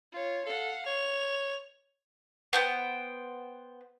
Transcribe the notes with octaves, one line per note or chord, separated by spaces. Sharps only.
F4 C#5
A4 F5 F#5
C#5 F7
B3 C5 G5